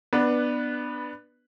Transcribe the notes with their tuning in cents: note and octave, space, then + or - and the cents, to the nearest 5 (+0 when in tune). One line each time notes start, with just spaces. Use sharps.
B3 +0 D4 +15 B4 -10